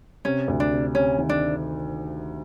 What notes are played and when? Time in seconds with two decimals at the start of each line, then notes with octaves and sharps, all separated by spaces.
0.25 C3 C#4
0.48 D2
0.60 D4
0.72 C3
0.94 C3 C#4
1.18 D#3
1.29 D4